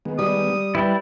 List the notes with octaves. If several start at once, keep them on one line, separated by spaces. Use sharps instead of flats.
D#3 G#3 B3
G3 D#6
G3 E4 B4